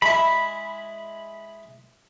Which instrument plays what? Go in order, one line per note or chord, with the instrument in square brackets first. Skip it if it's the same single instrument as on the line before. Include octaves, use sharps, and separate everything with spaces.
[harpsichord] G#3 E4 [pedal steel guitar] B5